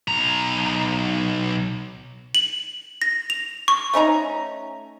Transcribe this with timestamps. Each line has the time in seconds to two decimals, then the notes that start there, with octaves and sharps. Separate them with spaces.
0.08 B1 A#5
2.35 F#7
3.02 A#6
3.30 F7
3.68 C#6
3.93 A3 C#4 D#4 A#5